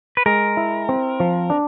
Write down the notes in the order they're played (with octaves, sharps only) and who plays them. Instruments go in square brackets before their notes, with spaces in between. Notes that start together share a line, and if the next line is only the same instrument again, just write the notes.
[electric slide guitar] B4
[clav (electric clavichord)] G#3 [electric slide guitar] A#4
[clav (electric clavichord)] E4
C4
F3
D4